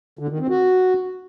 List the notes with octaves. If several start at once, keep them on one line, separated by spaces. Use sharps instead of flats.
D3
D#3
C4
F#4